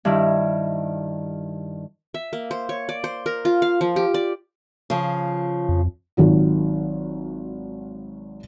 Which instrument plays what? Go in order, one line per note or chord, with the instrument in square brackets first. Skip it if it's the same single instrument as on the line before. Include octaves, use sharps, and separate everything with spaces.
[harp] G2 D#3 E4
[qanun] E5
A#3
C5
C#5
D5
C5
A#4
F4
F5
F3
G4
D5
[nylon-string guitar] C#3 F3
[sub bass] F2
[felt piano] G#1 D#3 F#3 F4